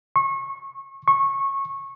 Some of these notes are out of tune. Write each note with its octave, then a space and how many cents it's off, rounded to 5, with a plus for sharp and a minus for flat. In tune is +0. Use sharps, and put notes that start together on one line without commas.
C#6 -30
C#6 -20